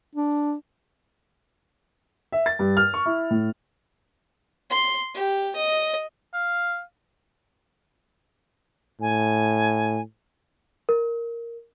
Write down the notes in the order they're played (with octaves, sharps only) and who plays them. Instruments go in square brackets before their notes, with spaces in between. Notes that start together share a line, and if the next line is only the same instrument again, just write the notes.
[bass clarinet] D4
[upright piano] E5
A6
G2
F6
C#6
E4
A2
[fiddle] C6
G4
D#5
[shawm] F5
[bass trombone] A2 [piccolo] G#5
[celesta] A#4